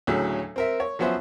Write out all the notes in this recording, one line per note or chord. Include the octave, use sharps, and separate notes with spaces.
D2 A2 C#3 F#3
C4 A#4 E5
C#5
F3 F#3 B3 C#4 C5 E5